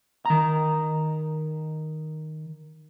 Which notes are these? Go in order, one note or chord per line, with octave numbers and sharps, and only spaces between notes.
D#3 A#5